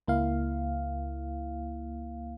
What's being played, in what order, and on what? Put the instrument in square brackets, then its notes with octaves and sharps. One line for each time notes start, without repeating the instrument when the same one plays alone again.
[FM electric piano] C#2 A#3 E4 F5